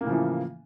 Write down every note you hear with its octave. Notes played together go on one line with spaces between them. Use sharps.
A2 C#3 E3 F3 A#3